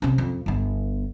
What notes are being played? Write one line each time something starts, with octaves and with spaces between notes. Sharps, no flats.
C3 C#4
F2
G1 B3